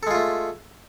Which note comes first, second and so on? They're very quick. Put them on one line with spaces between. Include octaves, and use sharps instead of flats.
A4 G#3 F4 A3